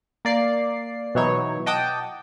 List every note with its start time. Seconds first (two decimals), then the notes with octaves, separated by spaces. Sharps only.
0.25 A#3 D5 C7
1.15 B2 E3 F#3 D#4 E4 C#5
1.66 D#5 F#5 G5 A5 D6 D#6